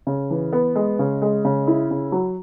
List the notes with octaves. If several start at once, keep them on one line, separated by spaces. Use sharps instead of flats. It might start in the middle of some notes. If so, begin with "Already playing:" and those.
C#3
E3
B3
G#3
C#3
G#3
C#3
E4
C#3
F#3